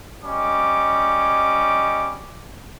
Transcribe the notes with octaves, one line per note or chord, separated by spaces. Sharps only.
G3 C#4 D#5 D6